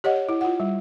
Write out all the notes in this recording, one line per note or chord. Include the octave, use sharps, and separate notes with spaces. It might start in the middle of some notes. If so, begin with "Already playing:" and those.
G4 C#5 D#5 F#5
E4
F4 F#5
G3